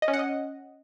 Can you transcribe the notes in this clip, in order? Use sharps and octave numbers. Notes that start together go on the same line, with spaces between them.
D#5
C#4
F#5
D#5